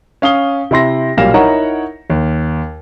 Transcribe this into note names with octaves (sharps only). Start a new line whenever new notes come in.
C#4 F5 D#6 G7
C3 E4 C6 A#6
B1 A#2 G3 F5 A#6 E7
D#4 E4 A#4 C#5 F#5 A#5
D#2